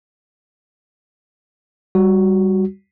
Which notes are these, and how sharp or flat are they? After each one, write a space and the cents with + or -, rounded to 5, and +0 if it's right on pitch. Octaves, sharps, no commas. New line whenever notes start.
G3 +0 F#4 +0